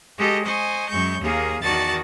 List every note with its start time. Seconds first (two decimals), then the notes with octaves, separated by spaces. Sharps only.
0.17 G#3 F#4 G4 A4 D#5
0.45 C5 D#5 G#5 C#6
0.90 F#2 G#3 C#6 G6
1.21 D#2 A#3 G#4 F5
1.62 E2 D#3 F#4 D5 A5 A6